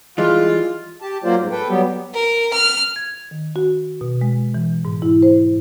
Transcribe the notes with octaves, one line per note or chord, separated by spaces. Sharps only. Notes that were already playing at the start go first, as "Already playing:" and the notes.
E3 G3 G#3 F4
G4 A5
F#3 A#3 F4 C5 D5
G#2
A4 B4 G5
F#3 G3 B3 G4
A#4
F6
G#6
D#3
F#4
B2
G#3
E3
G#2
E4
C5